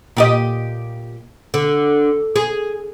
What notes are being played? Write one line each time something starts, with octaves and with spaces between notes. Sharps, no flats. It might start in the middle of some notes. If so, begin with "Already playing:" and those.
A#2 G4 D#5
D3
G#4